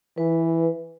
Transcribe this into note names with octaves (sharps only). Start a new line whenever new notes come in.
E3 B4